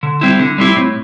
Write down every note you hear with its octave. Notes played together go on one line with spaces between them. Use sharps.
D3
G3 C4 E4
D3
G3 C4 E4
A2